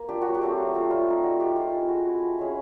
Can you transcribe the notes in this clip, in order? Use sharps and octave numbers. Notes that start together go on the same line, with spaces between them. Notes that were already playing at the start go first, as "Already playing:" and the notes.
Already playing: A#3
D4 F4 G4
F#3 F#4
G4
A3 C4 F4
F#3
A3 C4 F4
G3 F4
C4 D#4
G3 F#4
C4 D#4 G4
G#3 F4
C4 E4
G#3 F#4
C4 E4
F3
G#3 C#4 E4